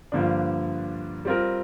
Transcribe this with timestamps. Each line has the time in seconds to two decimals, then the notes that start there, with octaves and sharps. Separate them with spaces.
0.12 G2 D3 F3 A#3 D4
1.25 G3 C4 F4 A#4